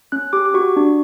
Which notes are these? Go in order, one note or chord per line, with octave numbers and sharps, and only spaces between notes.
C#4 F#6
G4 D6
D6
F#4 C#6
D4